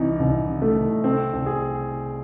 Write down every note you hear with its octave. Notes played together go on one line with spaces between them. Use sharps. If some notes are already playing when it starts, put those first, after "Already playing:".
Already playing: C2 C3 E3 D#4
C2
C3
A3
C2
C3 C4
C2
G#4